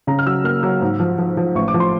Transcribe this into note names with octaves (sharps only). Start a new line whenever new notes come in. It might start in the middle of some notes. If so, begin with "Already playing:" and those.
C#3 A#5
F6
F#3 E6
A#3 F6
F#3 E6
G#2
F3
F3
F3
A1 C#6
D6
F3
C6